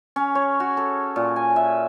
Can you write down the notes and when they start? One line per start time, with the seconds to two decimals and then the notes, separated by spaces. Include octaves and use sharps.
0.16 C#4
0.35 C#5
0.60 F#4
0.77 A4
1.16 A#2
1.36 G#5
1.56 E5